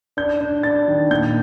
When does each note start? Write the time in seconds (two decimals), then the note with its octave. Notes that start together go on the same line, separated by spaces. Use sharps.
0.17 D4 G6
0.41 D4
0.63 D4 A6
0.88 D#3
1.11 A#2 G6